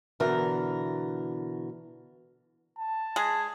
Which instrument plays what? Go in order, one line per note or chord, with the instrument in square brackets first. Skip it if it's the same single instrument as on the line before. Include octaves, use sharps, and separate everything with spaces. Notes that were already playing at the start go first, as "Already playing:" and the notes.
[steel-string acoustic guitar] B2 D3 E3 A#4
[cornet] A5
[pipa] G#3 G#4